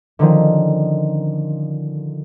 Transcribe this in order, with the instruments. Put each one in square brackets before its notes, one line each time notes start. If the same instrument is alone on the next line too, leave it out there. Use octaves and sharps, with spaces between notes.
[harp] D3 D#3 F3 C#4